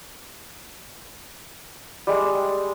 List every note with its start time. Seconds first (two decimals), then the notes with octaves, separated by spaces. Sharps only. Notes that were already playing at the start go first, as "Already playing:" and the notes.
2.07 G3 G#3